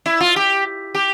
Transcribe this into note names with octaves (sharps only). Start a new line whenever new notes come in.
E4
F4
G4
G4